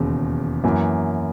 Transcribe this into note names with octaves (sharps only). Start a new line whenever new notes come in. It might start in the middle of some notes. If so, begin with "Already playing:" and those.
Already playing: E1 D#2 C#3
F#2 E3 A#3